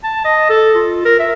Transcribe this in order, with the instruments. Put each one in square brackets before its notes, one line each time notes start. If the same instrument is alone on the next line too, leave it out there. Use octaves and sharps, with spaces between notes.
[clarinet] A5
D#5
A4
F4
A#4
E5